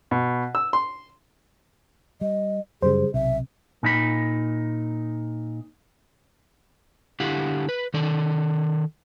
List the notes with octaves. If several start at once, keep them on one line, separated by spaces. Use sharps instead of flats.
B2
E6
C6
G3 D#5
F#2 C#3 G3 G#4 C5
B1 C3 E5
A#2 D#4 B5
D3 E4 G4 F5 F#5
B4
D#3 A4 D5